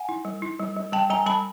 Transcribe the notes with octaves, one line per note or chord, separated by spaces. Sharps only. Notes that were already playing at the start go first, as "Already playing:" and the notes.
Already playing: F#5 G#5
E4
G3
E4
G3
G3
G3 G5 A5
G3 G#5 A#5
G3 A5 B5